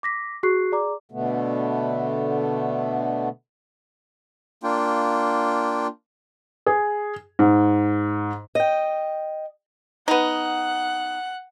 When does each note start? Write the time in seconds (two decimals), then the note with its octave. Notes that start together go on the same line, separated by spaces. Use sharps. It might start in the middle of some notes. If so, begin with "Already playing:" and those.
0.03 D6 A#6 B6
0.43 F#4 G#4 C#6 F#6 C7
0.72 G#4 D5 A#5 D6
1.12 B2 D3 A3 B3
4.63 A#3 D4 F4 G5
6.66 G#4
7.39 G#2
8.55 D#5 G5
10.08 B3 D#4 F#5 F#6